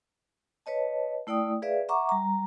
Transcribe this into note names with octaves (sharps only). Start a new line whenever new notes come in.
B4 C#5 D#5 A5
A3 E4 D5 G5 D#6
G#4 B4 D5 E5 F5
E5 F#5 A#5 C#6 D6
G3 A#5